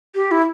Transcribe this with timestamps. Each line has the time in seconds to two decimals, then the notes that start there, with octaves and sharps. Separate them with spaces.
0.15 G4
0.31 E4